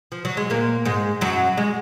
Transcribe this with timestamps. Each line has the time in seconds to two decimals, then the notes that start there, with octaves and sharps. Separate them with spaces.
0.12 F3
0.25 F#3
0.37 G#3
0.50 A#2 A#3
0.85 G#2 G#3
1.21 F#2 F#3
1.57 G#3